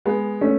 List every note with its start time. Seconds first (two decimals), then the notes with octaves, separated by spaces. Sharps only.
0.05 G#3 B3
0.41 A3 C#4